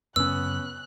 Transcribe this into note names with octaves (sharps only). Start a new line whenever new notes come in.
F#2 C#3 B3 C#4 E6 F#6